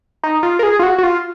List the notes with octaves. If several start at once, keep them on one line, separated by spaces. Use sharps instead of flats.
D#4
F4
A#4
G#4
F4
F#4
F#4
F4